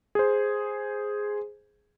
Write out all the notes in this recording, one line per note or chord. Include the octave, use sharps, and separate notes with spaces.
G#4 C5